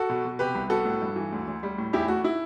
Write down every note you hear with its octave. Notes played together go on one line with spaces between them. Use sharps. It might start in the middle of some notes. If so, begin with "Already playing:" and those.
Already playing: F#4 A4
B2
B2
C3 G4 B4
C2
B3 F#4 A4
A2
G2
E3
D2
D2
G3
A2
E2 E4 G4
A3 F#4
E4